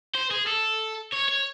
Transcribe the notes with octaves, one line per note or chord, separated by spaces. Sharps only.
C5
G#4
A4
C#5
C#5